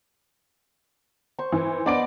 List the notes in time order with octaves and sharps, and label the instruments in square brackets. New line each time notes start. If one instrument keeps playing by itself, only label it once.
[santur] C5 C#6
[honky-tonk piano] E3
[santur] B3 D#5 [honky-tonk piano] D4 D5 D7